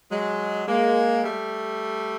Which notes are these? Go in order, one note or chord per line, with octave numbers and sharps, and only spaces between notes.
F#3 G#3
G#3 A#3
G3 A3